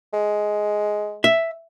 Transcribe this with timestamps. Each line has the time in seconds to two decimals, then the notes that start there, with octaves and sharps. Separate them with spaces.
0.13 G#3
1.24 E5